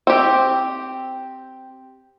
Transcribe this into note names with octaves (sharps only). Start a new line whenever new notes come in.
C4 G4